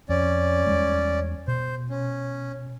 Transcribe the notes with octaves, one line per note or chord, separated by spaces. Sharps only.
F2 C#4 D5
E2 G3 G#3
B2 C5
C#4